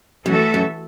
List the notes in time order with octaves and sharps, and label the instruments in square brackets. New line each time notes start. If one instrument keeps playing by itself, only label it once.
[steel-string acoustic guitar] F#2 [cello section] E3 A3 F#4 A4 E5
[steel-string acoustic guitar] F#2